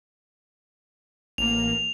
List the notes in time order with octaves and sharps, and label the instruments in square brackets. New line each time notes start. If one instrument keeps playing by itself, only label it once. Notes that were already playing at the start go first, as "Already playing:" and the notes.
[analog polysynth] A1 A#3 [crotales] F7